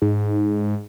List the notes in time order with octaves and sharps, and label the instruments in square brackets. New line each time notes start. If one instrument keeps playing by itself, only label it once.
[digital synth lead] G#2